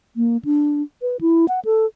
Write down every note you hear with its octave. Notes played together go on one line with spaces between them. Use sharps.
A#3
D4
B4
E4
F#5
A4